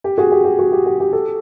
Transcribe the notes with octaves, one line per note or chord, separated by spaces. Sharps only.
G4
F#4 G#4
G4
G4
F#4
G4
G4
G4
G4 A4